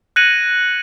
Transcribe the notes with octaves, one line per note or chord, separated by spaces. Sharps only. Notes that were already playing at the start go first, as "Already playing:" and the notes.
F#6 G#6 A#6 C#7 D#7 F#7